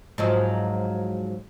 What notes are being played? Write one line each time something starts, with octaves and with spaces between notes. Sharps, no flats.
G#2 F3 F#3